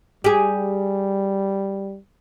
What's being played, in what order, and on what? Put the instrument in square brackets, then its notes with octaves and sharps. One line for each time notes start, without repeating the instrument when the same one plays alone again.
[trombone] G3 [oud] G4 G#4